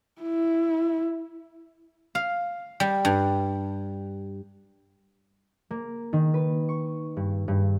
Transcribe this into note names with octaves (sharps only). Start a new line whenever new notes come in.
E4
F5
G3
G2
A#3
D#3
B4
C#6
G2
G2